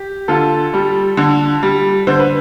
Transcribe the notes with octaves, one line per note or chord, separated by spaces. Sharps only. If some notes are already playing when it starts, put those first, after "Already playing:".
Already playing: G4
D3 F4 A4
G3
D3
G3
D3 C5
B4